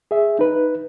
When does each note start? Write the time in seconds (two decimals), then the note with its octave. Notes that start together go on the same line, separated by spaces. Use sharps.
0.11 G#4 E5
0.39 D#4 B4